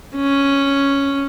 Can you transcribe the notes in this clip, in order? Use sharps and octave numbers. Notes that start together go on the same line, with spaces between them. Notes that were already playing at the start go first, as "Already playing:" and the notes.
C#4